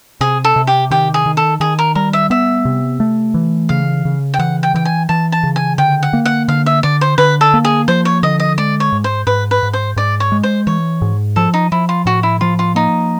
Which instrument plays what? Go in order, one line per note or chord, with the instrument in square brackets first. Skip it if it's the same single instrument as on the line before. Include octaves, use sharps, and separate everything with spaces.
[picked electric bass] C3 [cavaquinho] G#4
[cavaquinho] A4
[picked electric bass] C3
[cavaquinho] G4
[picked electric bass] D#3 [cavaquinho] G4
[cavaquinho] G#4
[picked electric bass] D#3
[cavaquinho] A4
[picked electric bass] D#3 [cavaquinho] G#4
[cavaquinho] A#4
[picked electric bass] G3 [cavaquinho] A#4
[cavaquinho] E5
[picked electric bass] B3 [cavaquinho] E5
[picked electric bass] C3
A3
E3
[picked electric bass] C#3 [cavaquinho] F5
[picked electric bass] C#3
[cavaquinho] G5
[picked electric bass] E3 [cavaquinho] F#5
[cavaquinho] G5
[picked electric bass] E3 [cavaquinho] G5
[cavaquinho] G#5
[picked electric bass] E3 [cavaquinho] A5
[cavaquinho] A5
[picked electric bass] C#3
[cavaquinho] G#5
[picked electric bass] D3 [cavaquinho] G5
[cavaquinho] F#5
[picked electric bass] A#3
[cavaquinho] F#5
[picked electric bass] D3 [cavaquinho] F5
[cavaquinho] E5
[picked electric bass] D3 [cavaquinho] D5
[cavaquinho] C5
[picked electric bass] D3 [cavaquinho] B4
[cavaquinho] A4
[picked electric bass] A#3
[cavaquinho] G#4
[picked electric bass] F3 [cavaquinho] C5
[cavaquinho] C#5
[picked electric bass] D3 [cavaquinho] D#5
[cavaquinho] D#5
[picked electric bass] G#3 [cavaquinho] D5
[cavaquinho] C#5
[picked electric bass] G#2
[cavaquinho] C5
[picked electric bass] G#2 [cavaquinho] B4
[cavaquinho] B4
[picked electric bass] G#2
[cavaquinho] C5
[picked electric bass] G#2 [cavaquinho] D5
[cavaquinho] C#5
[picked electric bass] G#3
[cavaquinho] C5
[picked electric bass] E3 [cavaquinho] C#5
[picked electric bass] G#2
[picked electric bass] F3 [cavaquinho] A4
[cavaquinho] D#4
[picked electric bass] F3 [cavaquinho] E4
[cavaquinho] F4
[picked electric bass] A2 [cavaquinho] F#4
[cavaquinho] E4
[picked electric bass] F3 [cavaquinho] F4
[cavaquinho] F4
[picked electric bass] A#3 [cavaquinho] D#4